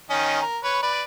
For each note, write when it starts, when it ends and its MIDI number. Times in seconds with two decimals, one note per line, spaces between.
0.10 0.41 51
0.10 0.41 61
0.10 0.41 75
0.42 0.59 70
0.64 0.82 71
0.64 0.82 73
0.83 1.02 71
0.83 1.02 74